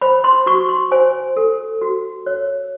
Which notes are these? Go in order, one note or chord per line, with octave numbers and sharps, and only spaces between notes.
C5 B5
C6
F#4 C#6
C6
C5 G#5
A4
F#4
C#5